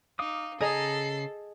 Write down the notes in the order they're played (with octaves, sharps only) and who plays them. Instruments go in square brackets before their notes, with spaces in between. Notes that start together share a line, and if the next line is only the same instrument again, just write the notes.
[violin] D#4 [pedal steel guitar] F5 D6 D#6
[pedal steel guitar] C#3 A#5 D#6 [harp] G#4 D#5 [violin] A4 C7